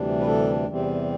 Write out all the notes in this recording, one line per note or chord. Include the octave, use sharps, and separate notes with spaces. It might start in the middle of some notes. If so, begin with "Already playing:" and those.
Already playing: D2 C3 E3 G3 D4
B4
A4
E2 C3 E3 G3 C4